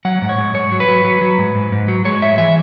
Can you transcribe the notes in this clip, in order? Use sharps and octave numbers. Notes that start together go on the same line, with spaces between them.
F#3 F#5
G#2
C#5
G#2
G#2 C#5
F#3
B4
F#3
F#3
F#3
G#2
G#2
G#2
F#3
G#3 C#5
G#2 E5
E3 E5